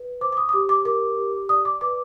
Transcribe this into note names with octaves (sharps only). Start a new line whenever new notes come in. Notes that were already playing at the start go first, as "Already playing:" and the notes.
Already playing: B4
C5 D6
D6
D#6
D#6
G4 D6
D6
A#4 D6
G4
D5 D#6
D6
B4 D6